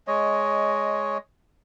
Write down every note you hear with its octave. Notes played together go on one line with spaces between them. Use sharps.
G#3 C#5 D#5